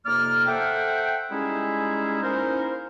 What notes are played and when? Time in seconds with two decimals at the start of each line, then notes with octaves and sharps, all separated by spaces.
0.06 F2 C3 A#3 D#4 D5 F6
0.46 A4 C5 E5 F#5 G5
1.31 G3 G#3 C#4 D#4 E4 G#4
2.23 A#3 C#4 D#4 E4 A#4 C5